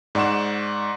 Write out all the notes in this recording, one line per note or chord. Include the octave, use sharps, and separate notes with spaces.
G#2 D5 F#5 C#6 E7